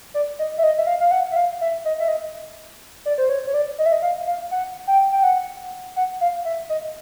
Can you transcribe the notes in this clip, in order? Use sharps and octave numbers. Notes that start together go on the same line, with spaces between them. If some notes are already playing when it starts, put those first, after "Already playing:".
D5
D#5
E5
D#5
E5
F5
F5
F#5
E5
F5
E5
D#5
E5
D#5
D5
C5
C#5
C#5
D5
D#5
E5
D#5
F5
F5
F#5
G5
G5
F#5
F#5
F5
E5
D#5